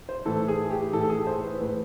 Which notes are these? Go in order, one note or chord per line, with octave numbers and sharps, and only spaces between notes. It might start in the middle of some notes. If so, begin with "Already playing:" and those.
C5
A2 E3 A4
G#4
G4
A2 E3 A4
G#4
C5
B4
A2 E3 B4